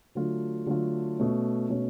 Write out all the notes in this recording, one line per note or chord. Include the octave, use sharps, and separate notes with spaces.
D3 F#3 A3 F4
D3 F#3 A3 F4
B2 A3 C#4
B2 A3 C#4